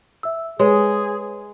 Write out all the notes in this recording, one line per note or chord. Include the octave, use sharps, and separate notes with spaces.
E5 E6
G#3 G#4 B4 C#5